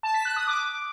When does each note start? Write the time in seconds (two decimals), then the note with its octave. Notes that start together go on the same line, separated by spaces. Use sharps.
0.03 A5
0.14 B6
0.25 F#6
0.36 D#6
0.47 D6